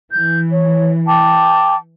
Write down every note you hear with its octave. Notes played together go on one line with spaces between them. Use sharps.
E3 G6
C#5
G5 A5 D6